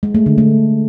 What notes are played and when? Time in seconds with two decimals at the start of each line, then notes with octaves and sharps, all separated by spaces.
0.03 G#3
0.15 A3
0.26 D3
0.38 A3